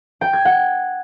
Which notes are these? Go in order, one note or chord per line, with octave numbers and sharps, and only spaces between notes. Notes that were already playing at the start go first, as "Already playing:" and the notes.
G5
G#6
F#5